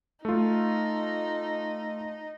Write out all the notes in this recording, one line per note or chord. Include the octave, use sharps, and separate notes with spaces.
A3 D#4 F4